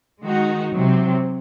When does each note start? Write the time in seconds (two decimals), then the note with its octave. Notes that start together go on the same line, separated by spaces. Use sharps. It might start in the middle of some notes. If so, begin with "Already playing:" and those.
0.23 D#3 G#3 D#4 F#4
0.73 C3 F#3 C4